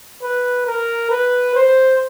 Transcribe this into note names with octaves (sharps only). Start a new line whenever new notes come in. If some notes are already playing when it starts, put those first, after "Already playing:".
B4
A#4
B4
C5